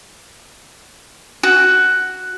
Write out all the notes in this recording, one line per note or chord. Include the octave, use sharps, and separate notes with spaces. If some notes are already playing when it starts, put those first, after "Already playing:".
F#4